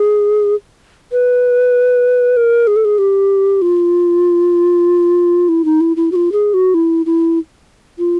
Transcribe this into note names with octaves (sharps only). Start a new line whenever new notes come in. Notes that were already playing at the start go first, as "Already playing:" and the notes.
Already playing: G#4
B4
A#4
G#4
A4
G#4
G4
F4
E4
D#4
E4
E4
F#4
F4
G#4
F#4
E4
E4
F4